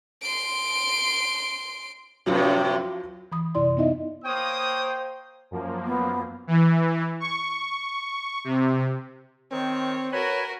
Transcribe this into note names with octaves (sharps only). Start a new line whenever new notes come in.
C6 D7
F#2 A2 C3 F3 F#3 F4
E3 B5 D#6
F#2 C3 E4 D5 C6
B3 D#4 E4 D#5 E5
A#3 C5 C#5 G5 D#6
F#2 F3 A#3
B3
E3
C#6
C3
D#3 C4 C#5
F#4 A#4 B4 C#5 G#5 B5